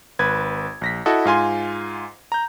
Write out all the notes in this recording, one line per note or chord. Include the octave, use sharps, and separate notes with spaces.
G#1 B4 G#6
A#1 A#6 B6
E4 F#4 A4 D#5
G#2 F4 G#5 C6
A#5 G6